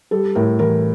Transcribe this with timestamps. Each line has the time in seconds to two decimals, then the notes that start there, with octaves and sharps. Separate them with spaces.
0.11 G3 A4
0.35 A2 A#4
0.59 E3 A#4